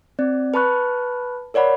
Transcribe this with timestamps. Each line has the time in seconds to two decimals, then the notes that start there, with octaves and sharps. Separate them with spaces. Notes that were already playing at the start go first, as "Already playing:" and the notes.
0.19 C4 D5
0.54 B4 A5 B5 C#6 F#6
1.54 A#4 C#5 D5 F#5 B5